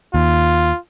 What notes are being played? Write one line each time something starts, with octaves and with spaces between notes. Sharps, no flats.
D#2 F4